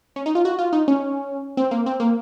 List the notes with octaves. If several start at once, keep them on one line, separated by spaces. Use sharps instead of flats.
C#4
D#4
F4
F#4
F4
D#4
C#4
C4
A#3
C4
A#3